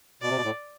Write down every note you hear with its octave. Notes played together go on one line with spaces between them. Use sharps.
B2 D5
C3
B2
A2